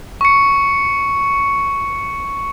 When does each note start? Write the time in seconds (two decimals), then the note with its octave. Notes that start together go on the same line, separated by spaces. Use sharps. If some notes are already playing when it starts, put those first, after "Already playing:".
0.21 C#6 C#7